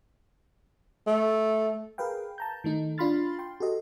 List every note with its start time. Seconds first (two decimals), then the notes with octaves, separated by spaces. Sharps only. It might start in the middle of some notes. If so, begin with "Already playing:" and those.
1.07 A3
1.98 G#4 A#4 B4 F5 G5
2.38 A5 A#5 G6
2.64 D#3 A3 D#4
2.98 D4 F4 B5 C6 F6 A6
3.39 G5 C6
3.60 F#4 G4 A4 D#5